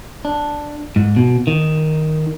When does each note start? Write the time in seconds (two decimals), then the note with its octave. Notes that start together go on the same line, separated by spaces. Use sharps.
0.25 D4
0.96 G#2
1.16 B2
1.47 D#3